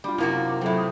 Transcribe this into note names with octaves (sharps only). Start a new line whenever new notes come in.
G3 D4 F4
F#2 C3 A#3 E4 F#4
D6
A2 F#3 C4 A4 E5
D#6